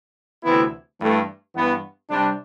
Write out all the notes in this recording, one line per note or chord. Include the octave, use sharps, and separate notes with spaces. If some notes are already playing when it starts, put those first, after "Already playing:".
D2 C3 E3 B3 E4
G2 E3 A3
G2 E3 B3
C3 G3 D4